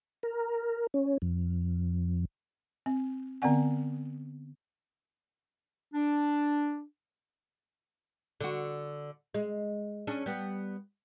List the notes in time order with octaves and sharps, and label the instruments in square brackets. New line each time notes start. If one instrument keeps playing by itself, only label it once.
[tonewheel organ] A#4
C#4
F2
[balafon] C4
D3 B3 C4 D5 F#5 G#5
[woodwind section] D4
[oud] D3 F#4
G#3
C#4 D4 G#4
G3 B3